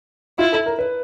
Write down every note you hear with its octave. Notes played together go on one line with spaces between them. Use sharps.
E4 F4
A4
A#4
B4